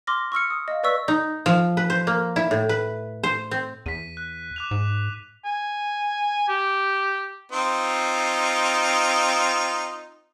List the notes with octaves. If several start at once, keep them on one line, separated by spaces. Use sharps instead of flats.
C6 D6 F6 A#6
C#6 E6 F6 C#7
D#6
D#5 F5
B4 D5 C#6 E6 B6
D#4
F3
B4
C5
A#3
E4
A2
B4
C5
C4
E2 B6 D#7
F#6
D6 F#6 F7
G#2
G#5
G4
C4 D#4 F4